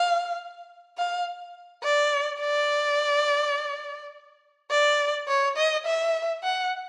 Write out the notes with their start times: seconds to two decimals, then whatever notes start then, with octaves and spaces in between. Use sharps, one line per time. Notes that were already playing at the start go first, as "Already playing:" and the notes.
Already playing: F5
0.98 F5
1.83 D5
2.41 D5
4.71 D5
5.28 C#5
5.57 D#5
5.86 E5
6.43 F#5